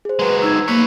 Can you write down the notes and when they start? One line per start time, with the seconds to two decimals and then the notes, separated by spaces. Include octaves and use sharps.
0.05 G#4 C5
0.19 F#3 G#3 B4
0.42 D#4 E6 G#6
0.68 A#3 B4 C#5